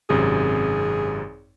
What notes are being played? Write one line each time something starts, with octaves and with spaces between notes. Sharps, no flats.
G#1 F#2 C3 G#4